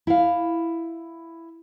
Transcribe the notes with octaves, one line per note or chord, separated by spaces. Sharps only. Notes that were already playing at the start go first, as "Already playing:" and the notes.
E4 F5